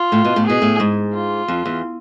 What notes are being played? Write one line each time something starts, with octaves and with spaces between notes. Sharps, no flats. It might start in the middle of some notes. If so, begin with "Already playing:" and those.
Already playing: F4
A2
B2
A2
B2 G#4
A2
G#2
F4
F2
E2